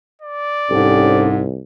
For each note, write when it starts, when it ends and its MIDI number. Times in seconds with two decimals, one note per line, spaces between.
0.22 1.33 74
0.71 1.60 36
0.71 1.44 44
0.71 1.29 61
0.71 1.29 67
0.71 1.29 69